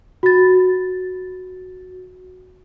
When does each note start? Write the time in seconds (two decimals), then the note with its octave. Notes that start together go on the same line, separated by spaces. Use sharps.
0.23 F#4 A6